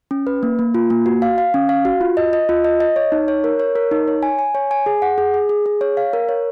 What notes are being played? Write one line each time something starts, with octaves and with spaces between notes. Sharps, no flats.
C#4
B4
A#3
A#3
F4
A#3
F#4
F5
F5
C#4
F5
F#4
F4
D#5
D#5
F4
D#5
D#5
C#5
D#4
C#5
A#4
C#5
A#4
D#4
C#5
G#5
G#5
C#5
G#5
G#4
F#5
G#4
G#4
G#4
G#4
C#5
F5
A#4
C#5